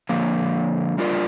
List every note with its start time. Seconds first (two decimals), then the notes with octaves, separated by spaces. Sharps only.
0.09 D3 F3 A#3
0.98 G3 D4 F4 A#4 D5